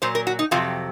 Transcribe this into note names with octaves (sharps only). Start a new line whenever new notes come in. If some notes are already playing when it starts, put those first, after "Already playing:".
A#2 F#3 C5
A#4
F#4
D#4
F2 C3 F#3 F4